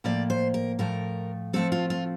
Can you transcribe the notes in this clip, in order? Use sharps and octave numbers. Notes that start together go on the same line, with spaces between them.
A2 F3 A#3 D5
C5
A#4
A2 F3 A3 A#4
A2 F3 A3 C4 A4
F4
F4